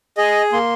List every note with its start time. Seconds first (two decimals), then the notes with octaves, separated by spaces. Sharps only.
0.17 G#4 D#5
0.53 A#3 C6